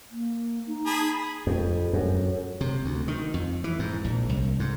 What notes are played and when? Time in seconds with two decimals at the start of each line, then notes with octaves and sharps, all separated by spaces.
0.11 A#3
0.67 D#4
0.86 G#4 A5 B5
1.47 F2
1.93 F#2
2.61 C3
2.84 D2
3.08 D#3
3.34 F2
3.64 E3
3.79 G#2
4.04 A#1
4.29 C2
4.60 G#2